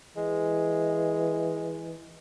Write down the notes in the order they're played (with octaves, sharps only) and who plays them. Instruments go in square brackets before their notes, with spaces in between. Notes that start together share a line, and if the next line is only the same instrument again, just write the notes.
[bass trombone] E3 [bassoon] G#3